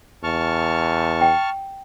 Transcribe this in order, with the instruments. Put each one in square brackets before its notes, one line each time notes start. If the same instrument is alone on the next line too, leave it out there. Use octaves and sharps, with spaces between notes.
[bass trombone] E2 [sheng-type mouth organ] A5 C#6 F6
[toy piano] G5